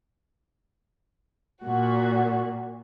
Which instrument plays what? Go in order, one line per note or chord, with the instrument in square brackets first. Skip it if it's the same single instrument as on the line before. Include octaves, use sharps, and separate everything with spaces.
[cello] A#2 [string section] F#4